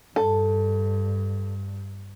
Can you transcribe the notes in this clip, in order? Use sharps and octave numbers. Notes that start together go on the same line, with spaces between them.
G2 A4